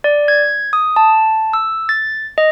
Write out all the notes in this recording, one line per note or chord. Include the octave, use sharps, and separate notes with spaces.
D5
G#6
D#6
A5
E6
A6
D#5